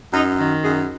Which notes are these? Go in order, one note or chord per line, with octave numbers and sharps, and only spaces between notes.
F#2 D#4
D#3
F#2 G#4